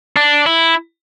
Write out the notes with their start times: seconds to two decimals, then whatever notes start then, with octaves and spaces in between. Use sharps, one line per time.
0.16 D4
0.46 E4